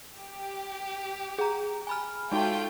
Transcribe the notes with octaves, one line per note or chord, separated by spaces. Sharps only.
G4
G#4 A#5
G#5 B5 F6
G#3 A3 D#4 F4 F#4 G5